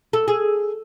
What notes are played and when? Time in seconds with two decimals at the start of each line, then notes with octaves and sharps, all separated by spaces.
0.13 A4
0.28 G#4